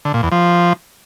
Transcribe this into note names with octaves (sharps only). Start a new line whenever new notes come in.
D3
A#2
E2
F3